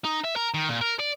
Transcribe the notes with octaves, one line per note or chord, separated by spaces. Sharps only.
D#4
E5
A#4
D#3
A#2
A#4
D5